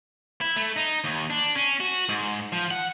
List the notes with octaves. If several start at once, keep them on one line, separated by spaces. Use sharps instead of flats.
E4
A3
D#4
D#2
D4
C#4
F#4
G#2
F3
F#5